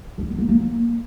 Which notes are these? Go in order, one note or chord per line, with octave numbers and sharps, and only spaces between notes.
D4
B3
A#3
A#3